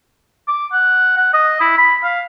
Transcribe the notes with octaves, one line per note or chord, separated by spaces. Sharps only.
D6
F#5
F#5
D#5
E4
B5
F5